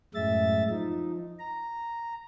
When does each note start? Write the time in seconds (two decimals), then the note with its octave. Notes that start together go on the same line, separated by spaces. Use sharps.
0.14 F#2 A2 G#3 E5 A6
0.70 F3 D#4
1.39 A#5